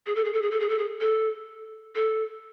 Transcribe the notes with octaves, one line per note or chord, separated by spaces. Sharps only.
G#4
A4
G#4
A4
G#4
A4
G#4
A4
G#4
A4
A4